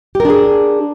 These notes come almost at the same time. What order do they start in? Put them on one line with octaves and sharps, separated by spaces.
G4 A#4 D4 G#4